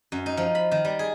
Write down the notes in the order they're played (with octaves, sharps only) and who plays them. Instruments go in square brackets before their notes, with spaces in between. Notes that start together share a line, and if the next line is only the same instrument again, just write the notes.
[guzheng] F#2
D#4
F3
B5
D#3
G3
G#4